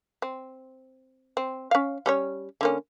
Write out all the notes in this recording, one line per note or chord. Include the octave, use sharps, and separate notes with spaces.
C4
C4
C#4 F5
G3 C#4 C#5
D3 A#3 C#4